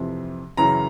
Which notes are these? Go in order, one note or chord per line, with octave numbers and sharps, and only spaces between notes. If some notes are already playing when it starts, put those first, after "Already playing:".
Already playing: F2 C3 E3
F#2 C#3 E3 A#5